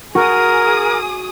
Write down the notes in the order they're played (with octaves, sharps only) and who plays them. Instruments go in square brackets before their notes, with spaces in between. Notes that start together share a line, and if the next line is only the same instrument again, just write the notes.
[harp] F#4 [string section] G#4 D#6 [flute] A#4